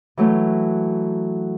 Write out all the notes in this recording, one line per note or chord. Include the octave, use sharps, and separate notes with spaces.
E3 F#3 A3